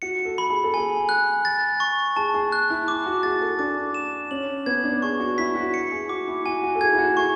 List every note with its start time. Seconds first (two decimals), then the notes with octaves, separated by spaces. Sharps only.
0.02 F#4 C#7
0.25 A4
0.38 B5
0.50 G#4
0.64 A4
0.74 G#4 G#5
1.09 F#6
1.45 A6
1.80 C#6
2.16 G#4 A5
2.34 G#4
2.52 F#6
2.70 E4
2.88 D6
3.06 F#4
3.23 G#4 A6
3.42 A4
3.59 D4 D6
3.94 E7
4.31 C#4 F#7
4.66 B3 G#6
4.84 D4
5.02 G#4 C#6
5.20 F#4
5.38 E4 B6
5.55 F#4
5.74 C#7
5.92 G#4
6.09 F#4 D6
6.28 E4
6.45 F#4 G#5
6.63 F#4
6.75 A4
6.81 G#4 G#6
6.93 E4
6.98 F#4
7.16 G#4 C#6